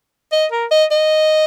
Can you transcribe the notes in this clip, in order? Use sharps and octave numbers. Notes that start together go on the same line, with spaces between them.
D#5
A#4
D#5
D#5